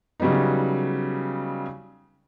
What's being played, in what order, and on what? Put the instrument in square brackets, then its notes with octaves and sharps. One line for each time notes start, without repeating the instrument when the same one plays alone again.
[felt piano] C#3 F#3 G3 B3 D#4